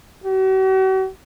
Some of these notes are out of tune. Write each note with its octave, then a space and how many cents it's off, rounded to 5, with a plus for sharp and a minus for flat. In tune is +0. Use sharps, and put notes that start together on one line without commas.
F#4 +45